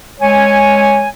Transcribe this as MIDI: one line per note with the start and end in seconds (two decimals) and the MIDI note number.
0.20 1.07 56
0.20 1.07 73
0.20 1.07 80